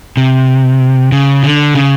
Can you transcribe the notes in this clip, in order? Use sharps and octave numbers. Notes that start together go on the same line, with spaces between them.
C3
C#3
D3
C#3